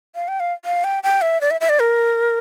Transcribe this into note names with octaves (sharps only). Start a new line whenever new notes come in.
F5
G5
F5
F5
G5
G5
E5
D5
E5
E5
D5
A#4